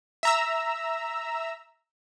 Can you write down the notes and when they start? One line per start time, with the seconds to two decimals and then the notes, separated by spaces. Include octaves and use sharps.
0.23 E5 A#5 E6